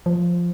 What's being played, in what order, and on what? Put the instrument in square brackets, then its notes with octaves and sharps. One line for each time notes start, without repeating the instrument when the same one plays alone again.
[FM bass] F3